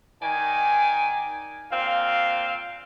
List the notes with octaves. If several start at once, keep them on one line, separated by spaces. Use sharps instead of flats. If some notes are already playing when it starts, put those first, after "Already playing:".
D#3 D5 G#5
A#2 C4 F5